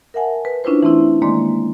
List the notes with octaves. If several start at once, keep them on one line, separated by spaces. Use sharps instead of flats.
A#4 E5 F#5 G#5 A5
B4
C#4 D4 E4 F4 B4 C5
E3 A3 C4 E4
D#3 G#3 A#3 D5 C6 D6